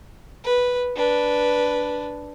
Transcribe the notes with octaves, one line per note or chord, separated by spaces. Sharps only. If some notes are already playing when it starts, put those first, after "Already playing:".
B4
D4 B4